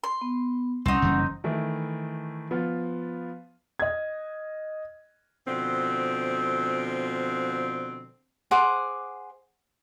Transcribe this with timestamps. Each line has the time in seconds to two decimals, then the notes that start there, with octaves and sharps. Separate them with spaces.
0.04 C6
0.21 B3
0.86 C2 C4 C#4 D#4 F#5
1.02 F#1 E3 G3
1.44 D#3 E3 A3 E4
2.51 F3 B3 F4
3.79 D#5 G#6
5.46 B2 D3 F3 C4
8.51 G#4 C5 F#5 D6